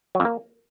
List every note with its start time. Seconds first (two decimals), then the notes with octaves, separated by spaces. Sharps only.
0.15 F#3
0.20 F2
0.25 A#3